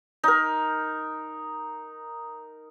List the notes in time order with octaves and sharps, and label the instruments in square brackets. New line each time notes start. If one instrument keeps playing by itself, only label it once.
[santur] D#4 A#4